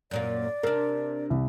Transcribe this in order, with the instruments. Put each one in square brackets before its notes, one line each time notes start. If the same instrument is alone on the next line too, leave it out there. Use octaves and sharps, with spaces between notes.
[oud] F#2 A#2 A#3 [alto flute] D5
[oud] C3 D4 [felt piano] A#4
[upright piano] C2